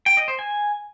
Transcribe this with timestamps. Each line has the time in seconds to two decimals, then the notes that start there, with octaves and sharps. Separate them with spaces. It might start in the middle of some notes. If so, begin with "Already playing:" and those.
0.06 G5
0.17 D#5
0.28 C5
0.39 G#5